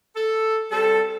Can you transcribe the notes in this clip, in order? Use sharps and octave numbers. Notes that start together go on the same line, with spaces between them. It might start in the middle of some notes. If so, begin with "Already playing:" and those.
A4
G3 C4 A4